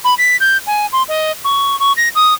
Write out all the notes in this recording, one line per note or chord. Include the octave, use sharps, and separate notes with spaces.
B5
B6
G6
G#5
C6
D#5
C#6
C#6
A#6
D#6